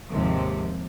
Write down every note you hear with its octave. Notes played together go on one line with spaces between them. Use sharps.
D#2 G#2 C3 F3